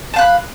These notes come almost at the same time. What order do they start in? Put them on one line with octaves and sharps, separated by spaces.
A5 F5 F#6 B5